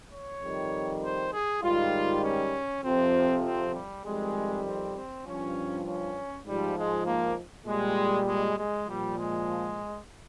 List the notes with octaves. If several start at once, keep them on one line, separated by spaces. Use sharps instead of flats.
C#5
F2 D#3 G3
C5
G#4
G#2 D#3 G3 F4
C#4
F2 C3 F3 C4
C4
G3
F2 D#3 G3 G#3
C4
C4
G2 F3 C#4
C#4
G#2 F3 G3
G#3
A#3
A#2 G3 G#3
G#3
G#3
A#2 F3 G3
G#3